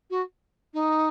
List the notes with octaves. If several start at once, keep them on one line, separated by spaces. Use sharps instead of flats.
F#4
D#4